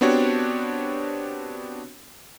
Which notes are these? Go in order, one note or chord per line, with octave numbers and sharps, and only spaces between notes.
B3 C4 D4 F#4 G4 C#5